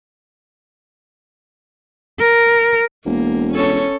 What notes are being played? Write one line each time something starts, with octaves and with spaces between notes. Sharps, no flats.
A#4
E1 A#3
C#4 A4 C#5